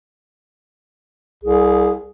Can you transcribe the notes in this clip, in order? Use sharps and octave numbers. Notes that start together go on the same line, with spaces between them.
C2 G#4